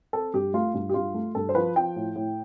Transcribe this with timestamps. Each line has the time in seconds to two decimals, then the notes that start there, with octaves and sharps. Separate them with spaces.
0.13 C4 A4
0.34 G2 G4
0.54 A3 F4
0.74 G2 F4
0.89 G4
0.94 G2 F4
1.14 A3
1.35 G2 A4
1.49 C5
1.55 F3 B4
1.76 F3 G5
1.96 A2
2.16 A2